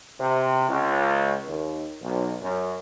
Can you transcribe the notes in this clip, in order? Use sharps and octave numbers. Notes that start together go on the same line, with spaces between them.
C3
C#2
D#2
B1
F#2